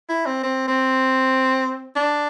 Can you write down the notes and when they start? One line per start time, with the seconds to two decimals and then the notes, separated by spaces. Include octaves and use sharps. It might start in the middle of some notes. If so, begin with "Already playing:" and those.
0.09 E4
0.26 C4
0.43 C4
0.68 C4
1.96 D4